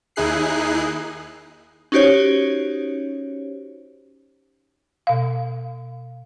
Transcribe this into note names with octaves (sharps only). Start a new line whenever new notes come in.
D#2 D#4 E4 G#4 F#6 C7
C#4 D#4 F#4 G4 C5 C#5
B2 F5